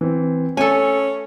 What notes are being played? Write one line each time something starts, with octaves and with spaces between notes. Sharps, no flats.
E3 C4
A3 C#4 A4 G#5